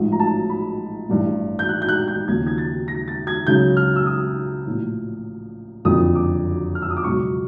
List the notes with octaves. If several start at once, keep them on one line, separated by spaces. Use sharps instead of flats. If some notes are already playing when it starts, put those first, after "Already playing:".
Already playing: A1 G#2 F3
A#5
A5
B5
A1 G2 E3
G6
F#6
G6
F#6
G6
D#2 C#3 F3 G#6
G#6
A6
A#6
A6
G#6
C#2 C#3 F#3 G6
F6
E6
D#6
A#1 A2 E3
F#1 F2 D3 F3 D#6
D6
F6
E6
D#6
D6
C#2 B2 F#3 C#6